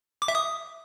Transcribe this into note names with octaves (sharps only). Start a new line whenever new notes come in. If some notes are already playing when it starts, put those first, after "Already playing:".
D6
E5
D#6